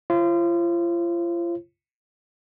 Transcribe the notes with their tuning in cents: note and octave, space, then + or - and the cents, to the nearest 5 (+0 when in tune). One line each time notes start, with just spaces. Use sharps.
F4 -35 C5 +40